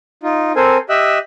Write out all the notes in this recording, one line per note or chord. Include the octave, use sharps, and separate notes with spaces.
D#4 F4
C4 A4 A#4 C5 G#5
G4 D#5 E5 E6 F#6